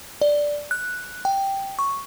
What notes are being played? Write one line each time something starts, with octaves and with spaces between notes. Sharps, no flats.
D5
F#6
G5
C#6